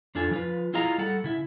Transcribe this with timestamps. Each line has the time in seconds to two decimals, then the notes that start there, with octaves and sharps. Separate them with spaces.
0.15 F2 D4 F4 A4 G#5
0.31 F3 F4 B4
0.73 E4 F4 G#4 D#5 F5 A#5
0.98 G3 A4 F#5
1.24 C#3 E4 E5